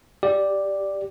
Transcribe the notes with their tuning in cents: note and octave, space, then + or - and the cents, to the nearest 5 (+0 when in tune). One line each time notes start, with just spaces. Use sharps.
G4 +0 D5 +0